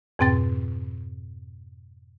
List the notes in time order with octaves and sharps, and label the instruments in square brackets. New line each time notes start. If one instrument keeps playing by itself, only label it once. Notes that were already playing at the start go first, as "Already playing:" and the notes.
[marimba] F2 G#2 B2 C4 G5 A6